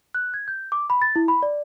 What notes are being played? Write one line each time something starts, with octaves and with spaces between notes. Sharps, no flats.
F#6
G#6
G6
D6
B5
A6
E4
B5
D5